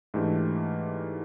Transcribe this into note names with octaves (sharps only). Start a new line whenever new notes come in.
G#2 E3 A3 D4 G4